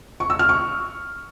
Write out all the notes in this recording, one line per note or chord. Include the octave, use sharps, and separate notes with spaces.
C#6
E6
F6
C#6